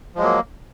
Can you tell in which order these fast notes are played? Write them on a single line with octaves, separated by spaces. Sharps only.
F3 G#3 F#3 A#3